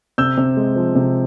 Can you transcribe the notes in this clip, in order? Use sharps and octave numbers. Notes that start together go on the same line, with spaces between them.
C3 E6 G6
C3
G#3
F3
C3